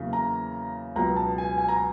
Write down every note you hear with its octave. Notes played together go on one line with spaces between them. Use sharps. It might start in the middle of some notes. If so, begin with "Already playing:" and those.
Already playing: E2 C#3 F#3 A#3
A#5
C#2 B2 F#3 B3 A#5
A5
G#5
G#5
A#5